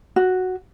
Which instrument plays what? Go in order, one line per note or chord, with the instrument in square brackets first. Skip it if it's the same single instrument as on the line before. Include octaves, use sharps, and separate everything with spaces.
[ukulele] F#4